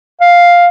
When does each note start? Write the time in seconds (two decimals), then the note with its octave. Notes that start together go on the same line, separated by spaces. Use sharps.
0.21 F5